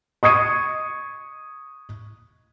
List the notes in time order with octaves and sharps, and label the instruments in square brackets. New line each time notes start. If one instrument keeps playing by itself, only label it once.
[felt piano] C#6 D#6 G#6 C#7 D#7